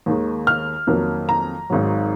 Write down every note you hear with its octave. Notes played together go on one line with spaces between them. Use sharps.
D#2 D#3 G#3
F6
F2 D#3 F#3 A#3
A#5
G#1 G#2 D#3 F#3